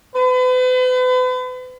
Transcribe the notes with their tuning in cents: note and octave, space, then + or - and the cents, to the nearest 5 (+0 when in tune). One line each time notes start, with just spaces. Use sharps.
B4 +40